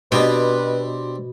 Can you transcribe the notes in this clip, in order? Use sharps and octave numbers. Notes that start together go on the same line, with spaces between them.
B2 C4 D4 G4 B4